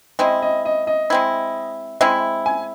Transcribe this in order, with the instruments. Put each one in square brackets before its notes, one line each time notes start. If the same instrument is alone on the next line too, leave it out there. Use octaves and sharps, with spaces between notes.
[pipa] G#3 C4 E4 [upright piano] D#5
[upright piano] D#5
D#5
D#5
[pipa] G#3 C4 E4
[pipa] G#3 C4 E4 [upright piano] E5
[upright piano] G#5